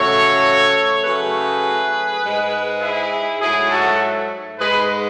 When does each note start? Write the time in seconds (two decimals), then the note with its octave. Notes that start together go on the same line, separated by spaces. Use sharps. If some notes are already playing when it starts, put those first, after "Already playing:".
Already playing: C#3 F#3 A3 A4 C#5
1.04 C#3 F#3 A3 G#4 B4
2.23 G#2 G#3
2.81 E4 G#4
3.40 G#2 F#3 A3 E4 G#4
3.70 F#4 A4
4.59 G#2 G#3 G#4 B4